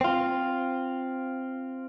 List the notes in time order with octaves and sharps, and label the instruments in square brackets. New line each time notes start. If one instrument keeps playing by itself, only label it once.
[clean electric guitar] C4 F4